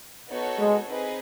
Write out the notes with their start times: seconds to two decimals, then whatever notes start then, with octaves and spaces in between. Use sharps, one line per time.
0.30 B3 D#4 F#4 A4 C#5
0.59 G#3
0.86 C4 D#4 G#4 B4